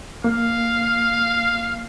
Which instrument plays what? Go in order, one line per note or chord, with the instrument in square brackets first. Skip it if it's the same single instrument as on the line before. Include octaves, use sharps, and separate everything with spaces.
[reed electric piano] A#3 [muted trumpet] F5